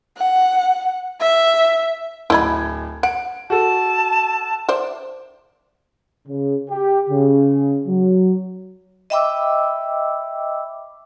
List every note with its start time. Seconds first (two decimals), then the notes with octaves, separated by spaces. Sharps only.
0.17 F#5
1.20 E5
2.30 D1 E4 D#5 B5 G#6
3.03 F#5 D7
3.50 F#4 A4 A5
4.69 C5 D5 E5
6.28 C#3
6.70 G4
7.09 C#3
7.87 F#3
9.10 D#5 E5 G5 B5 D6 E6